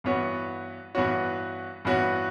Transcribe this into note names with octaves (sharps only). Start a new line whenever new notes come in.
G2 E3 B3 F#4 C#5
G2 E3 B3 F#4 C#5
G2 E3 B3 F#4 C#5